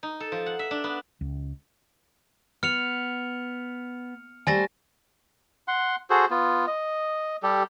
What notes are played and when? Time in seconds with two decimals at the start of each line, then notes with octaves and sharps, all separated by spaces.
0.03 D#4
0.20 A4
0.32 F3
0.46 F#5
0.59 E5
0.71 D4
0.84 B3
1.21 C#2
2.63 B3 F6 C#7 F7
4.47 G3 A3 C5 G#5 A6 A#6
5.68 F#5 C6
6.10 F#4 G#4 A4 C5
6.30 B3 F4
6.67 D#5
7.43 G3 G4 A4